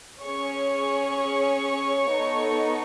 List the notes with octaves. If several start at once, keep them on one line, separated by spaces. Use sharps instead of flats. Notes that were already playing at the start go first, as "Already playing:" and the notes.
C#4 G#4 C#5 C#6
B3 D#4 A4